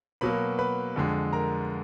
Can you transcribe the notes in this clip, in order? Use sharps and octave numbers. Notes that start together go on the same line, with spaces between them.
B2 F#3 A#3 B4 B5
B4 B5
F2 D3 G#3
A#4 A#5